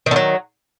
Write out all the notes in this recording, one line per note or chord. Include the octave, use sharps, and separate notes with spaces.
D3 D#3 F#3